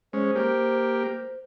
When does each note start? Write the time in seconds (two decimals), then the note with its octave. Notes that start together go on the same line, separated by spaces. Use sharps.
0.13 G#3 C#4 C5
0.35 A#3 G4